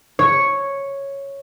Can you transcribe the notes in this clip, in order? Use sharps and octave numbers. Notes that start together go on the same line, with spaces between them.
C#5